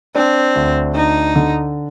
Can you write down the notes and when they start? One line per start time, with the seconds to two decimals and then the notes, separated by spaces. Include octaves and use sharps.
0.15 C4 D4
0.55 D2
0.95 D4 D#4
1.35 D3